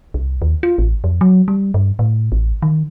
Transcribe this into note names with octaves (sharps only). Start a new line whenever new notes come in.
C2
D#2
F4
A1
F2
F#3
G3
G2
A2
A1
D#3